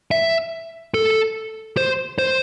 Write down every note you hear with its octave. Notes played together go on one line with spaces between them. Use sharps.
E5
A4
C5
C5